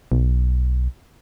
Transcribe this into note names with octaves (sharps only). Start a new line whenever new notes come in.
B1